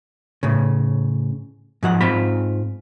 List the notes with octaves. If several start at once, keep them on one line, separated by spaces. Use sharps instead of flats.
A2 C#3
G#2 F3 F#5
G#2 C4 F4 B5